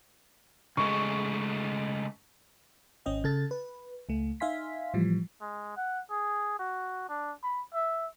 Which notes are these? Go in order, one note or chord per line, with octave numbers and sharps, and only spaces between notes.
C#3 G#3 A3 C#6
G#1 C#4 D#5 G5
C#3 A4 A6
B4
C#2 A3
D#4 E5 F5 G#5 C6 B6
A2 E3 F3 G3
G#3
F#5
G#4
F#4
D4
B5
E5